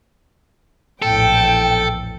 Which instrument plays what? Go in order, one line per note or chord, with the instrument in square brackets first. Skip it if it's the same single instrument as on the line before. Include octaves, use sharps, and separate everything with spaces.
[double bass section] A#1 E2 A2 [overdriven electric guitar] A4 [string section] G5